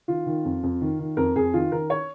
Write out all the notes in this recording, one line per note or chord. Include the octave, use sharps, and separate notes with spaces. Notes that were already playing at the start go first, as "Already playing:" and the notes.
D#3 F4
D#3
F2
F2
D#3
D#3
F2 A#4
F2 G#4
D#3 F4
D#3 A#4
C#5